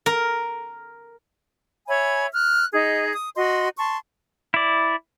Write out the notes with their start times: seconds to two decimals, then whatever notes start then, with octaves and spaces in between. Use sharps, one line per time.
0.06 A#4
1.87 C#5 E5 G#5 B5
2.32 F6 F#6
2.73 D#4 G#4 D#5
3.13 D#6
3.35 F#4 D#5 C6
3.77 A5 C6 C#6
4.54 E4 D5